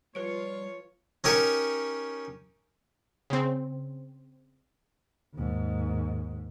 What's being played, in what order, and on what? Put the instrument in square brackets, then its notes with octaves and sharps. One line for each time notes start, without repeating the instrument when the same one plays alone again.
[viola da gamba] F3 F4 [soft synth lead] G3 [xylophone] B4 D7 [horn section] C#5
[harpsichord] C#4 D#4 G4 A#4 C#5
[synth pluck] C#3 C4
[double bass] D#2 G#2